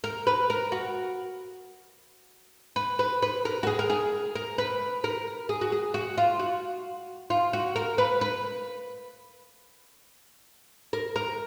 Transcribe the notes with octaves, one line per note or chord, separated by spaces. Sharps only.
A#4
B4
A#4
F#4
B4
B4
B4
A#4
F#4
G#4
A#4
G#4
A#4
B4
A#4
G#4
F#4
G#4
F#4
F4
F#4
F4
F#4
A#4
B4
B4
A#4
A#4